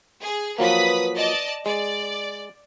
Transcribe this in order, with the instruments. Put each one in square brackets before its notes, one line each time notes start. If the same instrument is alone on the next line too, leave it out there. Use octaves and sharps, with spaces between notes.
[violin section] G#4
[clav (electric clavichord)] F3 F#3 A#3 [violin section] B4 D#6 B6
[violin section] D5 D#5 A5
[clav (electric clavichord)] G#3 [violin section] D5